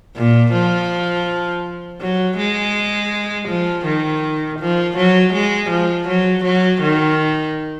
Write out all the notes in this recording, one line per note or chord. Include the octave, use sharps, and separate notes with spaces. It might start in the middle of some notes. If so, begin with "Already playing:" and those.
A#2
F3
F#3
G#3
F3
D#3
F3
F#3
G#3
F3
F#3
F#3
D#3